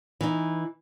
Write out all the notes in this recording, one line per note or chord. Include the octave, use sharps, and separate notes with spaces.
E3 D#4